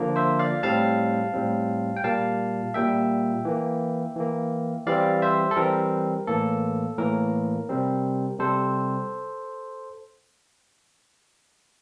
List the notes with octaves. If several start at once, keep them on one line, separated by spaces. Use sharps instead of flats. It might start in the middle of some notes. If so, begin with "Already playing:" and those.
Already playing: D3 F3 A#3
C5 E5
D5 F5
A2 G3 C4 F5 A5
A2 G3 C4
G5
A#2 G3 A#3 F5 A5
A#2 G3 A#3 E5 G5
E3 A#3
E3 A#3
E3 G3 C4 D5 F5
C5 E5
A4
E3 G3 C4 A#4
A2 E3 A#3 A4
A2 E3 A#3 A#4
C3 G3 C4
C3 G3 C4 A4 C5